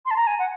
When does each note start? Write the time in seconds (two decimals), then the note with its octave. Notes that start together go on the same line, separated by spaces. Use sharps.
0.06 C6
0.11 A5
0.16 A#5
0.27 G#5
0.39 F#5